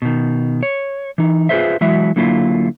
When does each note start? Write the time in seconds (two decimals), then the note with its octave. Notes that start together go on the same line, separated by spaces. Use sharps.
0.02 B2 D#3
0.63 C#5
1.18 E3 D#4
1.49 F4 G#4 A4 B4 C5 E5
1.81 E3 F#3 G#3 E4 F#4 E5
2.16 D3 F#3 A#3 E4 F4